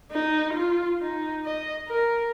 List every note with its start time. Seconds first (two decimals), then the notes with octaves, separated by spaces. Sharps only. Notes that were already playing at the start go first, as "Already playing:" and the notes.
0.11 D#4
0.54 F4
1.01 D#4
1.45 D#5
1.88 A#4